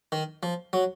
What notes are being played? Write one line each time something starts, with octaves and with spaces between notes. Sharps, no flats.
D#3
F3
F#3